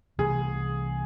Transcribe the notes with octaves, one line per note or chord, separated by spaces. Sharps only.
C2 C3 E3 A3 G#4